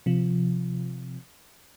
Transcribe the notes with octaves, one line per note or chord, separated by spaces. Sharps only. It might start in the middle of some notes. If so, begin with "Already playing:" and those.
C3 F3